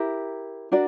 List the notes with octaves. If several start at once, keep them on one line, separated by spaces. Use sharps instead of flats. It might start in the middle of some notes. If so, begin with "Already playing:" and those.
Already playing: E4 G4 A#4
D4 F#4 A#4 D5